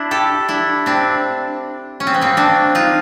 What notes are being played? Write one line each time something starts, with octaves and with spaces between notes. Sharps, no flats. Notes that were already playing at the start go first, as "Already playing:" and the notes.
Already playing: D4 E4
G4 A4
D4 E4
C4 D4
C#4
C4
B3
A#3 C4
C4 D4
D#4 F4